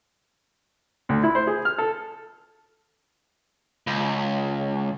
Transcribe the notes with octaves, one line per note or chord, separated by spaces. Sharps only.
D2
E4
C5
G#4
F6
A4
C#2